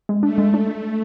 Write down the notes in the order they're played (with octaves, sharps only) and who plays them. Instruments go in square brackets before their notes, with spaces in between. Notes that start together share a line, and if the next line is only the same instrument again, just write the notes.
[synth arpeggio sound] G#3
[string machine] A3 [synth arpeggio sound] D4
[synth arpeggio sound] G#3
D4